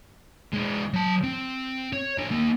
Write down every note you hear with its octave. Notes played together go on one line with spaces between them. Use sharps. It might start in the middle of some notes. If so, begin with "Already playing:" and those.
G#3 D4
F#3 A5
C4
C#5
A#3 D4
A#3 D#4